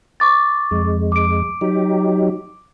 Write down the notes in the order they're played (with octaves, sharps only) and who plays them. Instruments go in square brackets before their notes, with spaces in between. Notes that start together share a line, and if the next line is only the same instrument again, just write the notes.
[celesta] C#6 D6 A6
[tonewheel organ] F2 G#3
[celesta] D6 D7
[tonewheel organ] F#3 D#4 G4